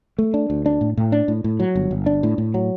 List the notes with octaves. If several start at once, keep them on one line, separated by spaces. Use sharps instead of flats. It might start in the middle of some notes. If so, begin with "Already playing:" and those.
A3
D4
D2
D4
A2
A2
D4
A2
A2
F#3
G1
G1
D4
A2
A2
F#3